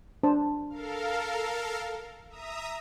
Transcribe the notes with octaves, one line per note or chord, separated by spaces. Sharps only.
D4 C5 A5
A4 A#4 F5
E5 A#5 D#6